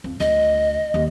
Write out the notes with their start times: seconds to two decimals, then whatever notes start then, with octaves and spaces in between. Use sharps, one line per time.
0.04 F2
0.20 D2 D#5
0.94 D#2